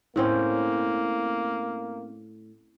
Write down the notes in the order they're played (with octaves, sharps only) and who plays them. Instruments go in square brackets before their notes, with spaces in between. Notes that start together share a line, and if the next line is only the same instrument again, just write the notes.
[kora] A2 C4 C#4 [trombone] A#3